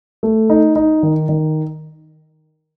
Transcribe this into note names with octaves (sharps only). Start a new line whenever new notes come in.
A3
D#4
D#4
D#3
D#3